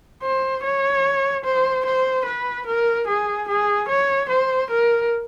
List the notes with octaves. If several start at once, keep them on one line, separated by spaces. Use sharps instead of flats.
C5
C#5
C5
C5
B4
A#4
G#4
G#4
C#5
C5
A#4